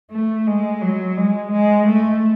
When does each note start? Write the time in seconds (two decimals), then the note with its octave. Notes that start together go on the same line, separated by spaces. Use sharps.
0.11 A3
0.47 G#3
0.82 F#3
1.18 G#3
1.52 G#3
1.87 A3